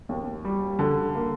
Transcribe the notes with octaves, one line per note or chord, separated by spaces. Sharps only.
D#2
G3
D3
A#3